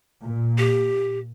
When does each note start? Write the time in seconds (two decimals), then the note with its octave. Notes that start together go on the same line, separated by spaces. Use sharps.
0.24 A#2
0.58 G4